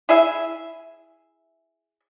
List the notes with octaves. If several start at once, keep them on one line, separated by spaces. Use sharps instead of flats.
E4 G#4 E5